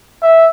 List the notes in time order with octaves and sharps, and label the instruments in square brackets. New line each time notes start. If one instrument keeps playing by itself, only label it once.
[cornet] E5